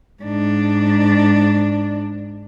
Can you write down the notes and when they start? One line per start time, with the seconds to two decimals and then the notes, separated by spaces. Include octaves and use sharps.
0.23 G#2 D4